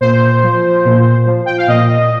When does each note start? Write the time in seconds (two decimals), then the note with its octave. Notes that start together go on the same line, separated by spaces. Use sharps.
0.01 A#2 C5
0.43 F3
0.85 A#2
1.26 F3
1.46 G5
1.58 F5
1.68 A#2 D#5